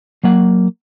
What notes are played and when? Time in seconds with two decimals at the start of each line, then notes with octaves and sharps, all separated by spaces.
0.23 F#3 A#3 F#5